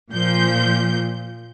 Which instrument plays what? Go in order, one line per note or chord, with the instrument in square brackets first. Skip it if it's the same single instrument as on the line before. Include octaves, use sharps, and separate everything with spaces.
[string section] A#2 F3 G6